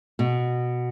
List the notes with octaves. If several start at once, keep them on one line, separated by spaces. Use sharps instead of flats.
B2